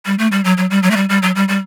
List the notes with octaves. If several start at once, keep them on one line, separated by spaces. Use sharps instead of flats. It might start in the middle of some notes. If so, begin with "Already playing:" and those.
G3
A3
G3
F#3
F#3
G3
F#3
A3
G3
G3
F#3
G3
G3